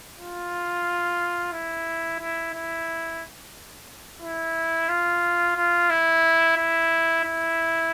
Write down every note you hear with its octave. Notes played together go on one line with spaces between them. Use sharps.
F4
E4
E4
E4
E4
F4
F4
E4
E4
E4